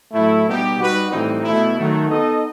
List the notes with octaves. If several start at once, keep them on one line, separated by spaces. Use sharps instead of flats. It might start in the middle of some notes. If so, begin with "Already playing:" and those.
A2 F#3 A3 E4
B2 G3 B3 D#4 G4
G3 D#4 F#4 B4
A2 E3 G3 C4 D#4
B2 A3 E4
D#3 F#3 A3
B3 D#4 A4 D#5